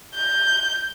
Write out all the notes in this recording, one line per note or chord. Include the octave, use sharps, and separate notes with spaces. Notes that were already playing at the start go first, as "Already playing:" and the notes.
G6